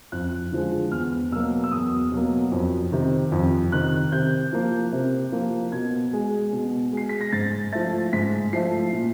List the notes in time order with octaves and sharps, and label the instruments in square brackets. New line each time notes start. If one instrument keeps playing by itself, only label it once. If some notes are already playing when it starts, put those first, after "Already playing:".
[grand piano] F2 F#6
D3 F3 G#3
E2 F6
B2 F#3 A#3 E6
E6
E2 D#6
B2 F#3 A#3
F2
C3 D#3
F2
C3 D#3 F#6
C3 G6
F3 A#3
C3
F3 A#3
B2 G#6
G#3
B2
G#3 C7
B6
A#6
G#2 A6
F3 A3 A6
G#2 B6
F3 A3 C7
A#2